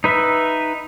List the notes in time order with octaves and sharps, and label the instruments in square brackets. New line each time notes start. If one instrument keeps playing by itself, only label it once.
[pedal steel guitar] D#4 B4 E5